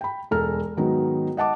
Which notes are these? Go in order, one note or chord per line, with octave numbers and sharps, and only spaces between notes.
G5 B5
E1 A4 A#5 F6
G#2 D#3 F#3 B3 D#4
D#5 F#5 A5 D6